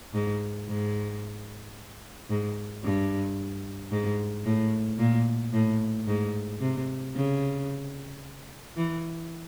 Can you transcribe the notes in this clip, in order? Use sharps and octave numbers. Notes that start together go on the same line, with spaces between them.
G#2
G#2
G#2
G2
G#2
A2
A#2
A2
G#2
C3
C#3
E3